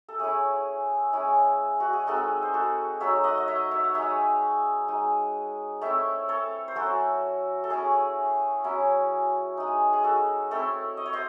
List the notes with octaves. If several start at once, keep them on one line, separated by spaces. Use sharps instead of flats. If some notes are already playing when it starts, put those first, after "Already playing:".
A4
A3 C#4 E4 G#4
G#3 C#4 E4
F#4
G#4
G#3 C4 D#4 F#4 A4
C5
F#4 A4
F#3 A3 D#4 C#5 E5
D#5 F#5
D#5
C#5 E5
C#5 E5
F#5
G#3 D#4 C#5 E5
G#3 D#4
A3 C4 E4 C#5 E5
A4 C#5
C5
F#3 C#4 E4 F#4 A4
A4
A3 C#4 E4 G#4
F#3 C#4 E4
G#3 D#4
G#4
F#4 A4
A3 C4 E4 A4 C#5
D#5
C#5
C5 D#5